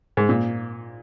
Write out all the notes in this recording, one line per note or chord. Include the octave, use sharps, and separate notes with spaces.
G#2
A#2